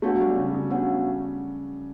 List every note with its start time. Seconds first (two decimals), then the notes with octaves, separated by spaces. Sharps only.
0.02 A3 B3 D4 F#4 C#5 F#5
0.15 F#3
0.20 G3
0.36 C#3
0.54 C#3
0.70 B3 D4 F#4 C#5 F#5